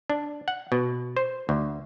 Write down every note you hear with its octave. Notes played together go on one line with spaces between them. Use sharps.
D4
F#5
B2
C5
D2